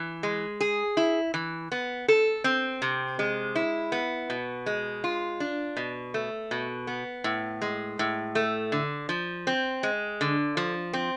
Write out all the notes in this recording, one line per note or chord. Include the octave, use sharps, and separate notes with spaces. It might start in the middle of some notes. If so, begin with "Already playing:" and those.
Already playing: E3
G#3
G#4
E4
E3
B3
A4
C4
C3
G#3
E4
B3
B2
G#3
F4
D4
B2
A3
B2
B3
A2
G#3
A2
A3
D3
F3
C4
G#3
D3
F3
C4